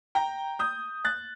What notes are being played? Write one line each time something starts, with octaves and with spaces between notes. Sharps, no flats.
G5 A#5
D#6 G6
F#6 A6